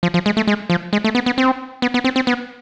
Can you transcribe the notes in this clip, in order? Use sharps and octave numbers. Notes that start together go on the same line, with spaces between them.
F3
F3
G#3
A3
G#3
F3
G#3
A3
B3
B3
C4
B3
B3
C4
C4
B3